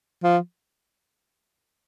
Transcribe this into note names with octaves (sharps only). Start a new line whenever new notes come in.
F3